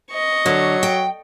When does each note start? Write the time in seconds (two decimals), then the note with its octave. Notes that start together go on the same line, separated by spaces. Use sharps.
0.11 D#5 C#6
0.46 D3 F#3
0.83 G5